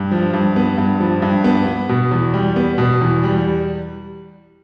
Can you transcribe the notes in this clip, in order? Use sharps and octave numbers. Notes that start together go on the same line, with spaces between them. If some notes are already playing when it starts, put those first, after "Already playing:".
Already playing: G2
F3
G2
B3
G2
F3
G2
B3
B3
B2
E2
G3
B3
B2
E2
G3